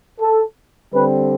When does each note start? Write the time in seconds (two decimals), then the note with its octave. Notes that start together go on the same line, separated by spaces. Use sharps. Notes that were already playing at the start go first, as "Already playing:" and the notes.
0.20 A4
0.94 D3 G3 C4 B4